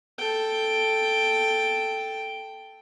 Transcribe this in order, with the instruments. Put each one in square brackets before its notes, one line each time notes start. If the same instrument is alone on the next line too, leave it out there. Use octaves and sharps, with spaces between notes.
[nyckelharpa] A4 G5